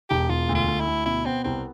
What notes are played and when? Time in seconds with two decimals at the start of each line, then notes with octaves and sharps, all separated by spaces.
0.10 E1 G4
0.29 E1 F4
0.49 D2
0.55 F4
0.68 D2
0.80 E4
0.87 D2
1.06 B2 E4
1.26 B3 C4
1.44 C2 C4